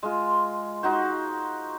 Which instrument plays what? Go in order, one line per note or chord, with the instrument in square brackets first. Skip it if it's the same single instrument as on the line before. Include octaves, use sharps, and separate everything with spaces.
[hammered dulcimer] G#3 F4
D#4 F#4 C5